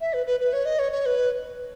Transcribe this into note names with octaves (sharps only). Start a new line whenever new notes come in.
E5
B4
B4
B4
C#5
D#5
C#5
C#5
B4